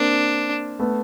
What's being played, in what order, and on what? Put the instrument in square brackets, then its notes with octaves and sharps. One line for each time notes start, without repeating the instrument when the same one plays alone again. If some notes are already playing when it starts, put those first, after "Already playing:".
Already playing: [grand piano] A#3 C4 [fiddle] D4
[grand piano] A3 B3